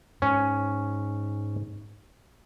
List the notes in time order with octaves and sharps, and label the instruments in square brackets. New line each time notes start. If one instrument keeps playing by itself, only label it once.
[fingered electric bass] G#2 [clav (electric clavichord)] C#4